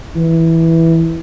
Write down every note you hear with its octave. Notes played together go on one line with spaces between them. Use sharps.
E3